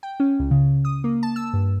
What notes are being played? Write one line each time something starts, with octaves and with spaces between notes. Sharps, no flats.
G5
C#4
C#2
C#3
D#6
A#3
A5
E6
G2